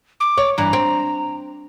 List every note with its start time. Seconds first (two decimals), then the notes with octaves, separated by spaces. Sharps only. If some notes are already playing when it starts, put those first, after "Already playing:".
0.20 D6
0.38 C#5
0.58 G2 E3 A#5
0.73 C4